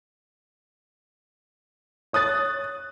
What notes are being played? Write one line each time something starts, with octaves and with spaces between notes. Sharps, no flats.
C#5 D#6 F#6 A6